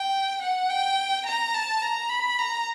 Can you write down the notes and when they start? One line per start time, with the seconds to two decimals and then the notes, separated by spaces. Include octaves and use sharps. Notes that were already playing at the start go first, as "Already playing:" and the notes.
Already playing: G5
0.42 F#5
0.70 G5
1.27 A#5
1.54 A5
1.82 A#5
2.10 B5
2.38 A#5